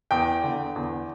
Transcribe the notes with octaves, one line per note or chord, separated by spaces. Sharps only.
E2 G5
D3
E2